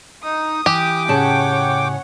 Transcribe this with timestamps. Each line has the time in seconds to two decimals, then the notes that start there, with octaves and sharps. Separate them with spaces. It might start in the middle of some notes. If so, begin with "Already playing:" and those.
0.23 D#4 D#6
0.66 E3 G4 G5 D6
1.08 A2 C#3 C#5 F#5 A5